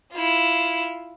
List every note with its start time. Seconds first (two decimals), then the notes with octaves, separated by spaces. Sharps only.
0.12 E4 F4